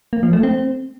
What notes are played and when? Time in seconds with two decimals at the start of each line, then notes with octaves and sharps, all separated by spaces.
0.13 A#3
0.23 F3
0.33 A3
0.43 C4